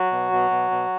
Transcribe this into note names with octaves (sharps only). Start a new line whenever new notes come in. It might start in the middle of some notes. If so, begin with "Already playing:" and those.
Already playing: F#3 F#4
B2
B2
B2
B2